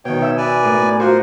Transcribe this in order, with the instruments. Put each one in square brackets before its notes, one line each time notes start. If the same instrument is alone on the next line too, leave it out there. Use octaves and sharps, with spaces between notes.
[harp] B2 D#3 [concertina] C#5 G5
[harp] E5 E6
[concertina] B4 D5 G#5
[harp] A2 A#4
[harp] F4 F#4 [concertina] A#4 C5